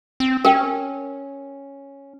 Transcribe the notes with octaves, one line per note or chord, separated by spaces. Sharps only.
C4
C#4 A#4 G5